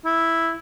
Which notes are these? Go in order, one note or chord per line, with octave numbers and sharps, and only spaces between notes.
E4